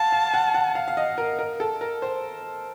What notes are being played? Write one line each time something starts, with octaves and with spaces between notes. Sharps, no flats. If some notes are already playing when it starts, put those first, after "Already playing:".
Already playing: F5 F#5 A5
F5
F#5
F#5
F5
F5
D#5
A#4
A#4
A4
A#4
C5